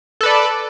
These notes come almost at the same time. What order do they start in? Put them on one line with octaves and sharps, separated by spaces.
A4 B4 D5